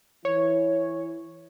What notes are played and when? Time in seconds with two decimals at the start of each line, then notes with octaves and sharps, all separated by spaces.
0.25 E3 E4 C#5